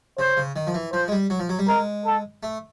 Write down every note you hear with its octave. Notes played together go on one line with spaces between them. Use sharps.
C#3 C5
C#3
D#3
F3
E3
F3 C5
G#3
G3
F#3
F3
F#3
G3
G#3 A#4
A4
A3